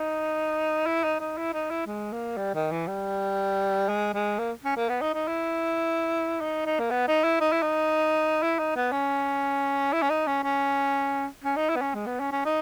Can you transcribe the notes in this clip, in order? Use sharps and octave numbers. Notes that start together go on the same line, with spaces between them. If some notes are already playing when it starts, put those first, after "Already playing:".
Already playing: D#4
E4
D#4
D#4
E4
D#4
E4
G#3
A#3
G3
D#3
E3
G3
G#3
G#3
A#3
C#4
A#3
B3
D#4
D#4
E4
D#4
D#4
A#3
B3
D#4
E4
D#4
E4
D#4
E4
D#4
B3
C#4
E4
C#4
D#4
C#4
C#4
C#4
D#4
E4
B3
C#4
G#3
B3
C#4
C#4
D#4